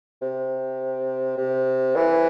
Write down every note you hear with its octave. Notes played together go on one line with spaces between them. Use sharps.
C3
C3
E3